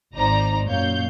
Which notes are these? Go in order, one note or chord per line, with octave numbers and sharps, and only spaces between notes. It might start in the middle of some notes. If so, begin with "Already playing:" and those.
G#1 D#4 C5 D5 A#5
F#2 A#2 C#5 F5 G6